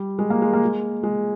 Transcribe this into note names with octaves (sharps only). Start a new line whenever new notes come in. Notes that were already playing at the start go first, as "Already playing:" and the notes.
Already playing: G3
G#3
A#3
G#3
A#3
G#3
G#3